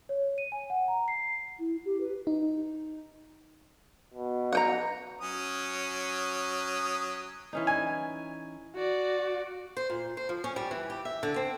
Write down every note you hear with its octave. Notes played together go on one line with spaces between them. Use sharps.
C#5
D#7
G#5
F#5
A#5
C7
E4
G4
B4
D#4
B2
F#5 G5 A#5
F#3 C#4 D#6
E3 C#4 D#4
G#5
F#4 D5
C5
A#2
C5
F3
C#4
G3
E3
G4
E5
D3
C4